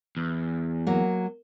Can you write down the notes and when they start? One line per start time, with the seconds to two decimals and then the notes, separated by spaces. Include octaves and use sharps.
0.17 E2
0.87 F#3 A#3